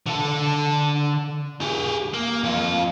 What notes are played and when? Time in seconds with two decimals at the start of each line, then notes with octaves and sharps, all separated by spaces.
0.07 D3 A4
1.61 G4 G#4
2.14 A#3
2.43 F2 F4